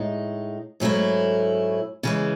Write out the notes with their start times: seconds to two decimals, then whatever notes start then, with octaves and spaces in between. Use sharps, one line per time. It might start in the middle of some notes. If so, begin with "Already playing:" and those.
Already playing: A2 G#3 D#4
0.80 G#2 F#3 A3 C#4 E4
2.03 C#3 E3 G#3